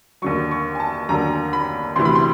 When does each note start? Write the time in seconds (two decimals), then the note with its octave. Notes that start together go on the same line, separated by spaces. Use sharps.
0.22 D#2 D3 F#3 C#6
0.51 C#6
0.75 G#5
0.80 A5
1.09 D#2 D3 F#3 A#5
1.53 B5
1.96 D2 C3 E3 C6
2.05 B5
2.15 C6